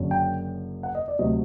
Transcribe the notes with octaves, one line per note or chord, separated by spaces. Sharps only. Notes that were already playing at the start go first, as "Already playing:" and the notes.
Already playing: F#1 F#2 D3 F#3
G5
F#5
D#5
D5
D2 C3 F#3 D#5